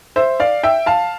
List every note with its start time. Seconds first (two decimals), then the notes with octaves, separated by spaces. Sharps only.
0.16 C5 E5
0.40 D5 F5
0.63 E5 G5
0.86 F5 A5